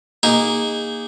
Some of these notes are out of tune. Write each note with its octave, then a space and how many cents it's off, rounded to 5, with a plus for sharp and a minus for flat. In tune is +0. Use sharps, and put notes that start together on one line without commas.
A#3 +0 D#4 +0 G#4 -25